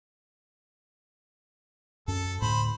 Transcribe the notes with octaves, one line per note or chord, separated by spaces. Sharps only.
F#2 C#4 A4
D2 A2 C5 B5